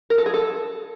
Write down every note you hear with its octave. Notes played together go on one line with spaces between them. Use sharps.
A#4
A4
G#4
A4